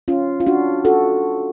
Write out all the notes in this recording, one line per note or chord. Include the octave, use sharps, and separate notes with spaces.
C#4 F4
F4
D4 F#4
F#4 A4